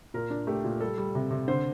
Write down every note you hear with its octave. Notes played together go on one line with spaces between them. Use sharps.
A#2 A#4
D4
A3 G4
A#2
G3 A4
G3
C3
C3
D3 C5